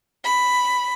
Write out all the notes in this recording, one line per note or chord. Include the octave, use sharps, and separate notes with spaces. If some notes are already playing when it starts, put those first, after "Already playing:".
B5